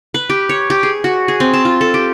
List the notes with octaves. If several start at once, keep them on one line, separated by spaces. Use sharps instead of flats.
B4
G4
C#5
G4
G#4
F#4
G#4
C4
A5
F4
A4
G4